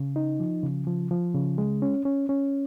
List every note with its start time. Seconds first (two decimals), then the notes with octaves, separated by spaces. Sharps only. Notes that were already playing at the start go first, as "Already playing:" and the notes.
Already playing: C#3
0.16 D#4
0.40 F3
0.63 C#3
0.87 F3
1.11 F3
1.35 C#3
1.58 G#3
1.82 C#4
2.05 C#4
2.29 C#4